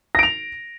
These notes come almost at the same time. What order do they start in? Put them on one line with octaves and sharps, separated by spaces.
A#6 D7 F7